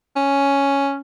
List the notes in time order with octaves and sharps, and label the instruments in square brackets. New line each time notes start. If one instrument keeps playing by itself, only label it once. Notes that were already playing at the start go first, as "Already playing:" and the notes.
[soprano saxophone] C#4